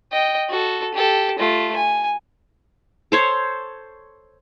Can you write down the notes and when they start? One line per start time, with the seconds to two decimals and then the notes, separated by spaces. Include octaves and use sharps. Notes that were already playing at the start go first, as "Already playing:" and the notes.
0.12 D#5 G5
0.49 F#4 A4
0.94 G4 A4
1.39 A3 F4
1.76 G#5
3.12 A4 C5 C#5